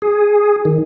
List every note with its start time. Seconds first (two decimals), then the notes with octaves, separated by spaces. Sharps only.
0.02 G#4
0.65 D#3